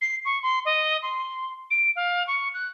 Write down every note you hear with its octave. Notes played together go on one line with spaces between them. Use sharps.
C7
C#6
C6
D#5
C6
D7
F5
C#6
F#6